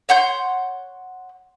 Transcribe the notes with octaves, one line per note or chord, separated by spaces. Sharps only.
C#5 F#5 C6 G6